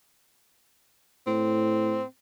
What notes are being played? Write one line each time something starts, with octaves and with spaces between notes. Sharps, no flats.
A2 C4